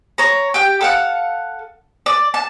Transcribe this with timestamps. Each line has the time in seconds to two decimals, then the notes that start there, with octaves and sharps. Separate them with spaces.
0.18 C#5 A#5
0.54 G4 G5
0.81 A4 F5 F#5
2.06 D5
2.34 A5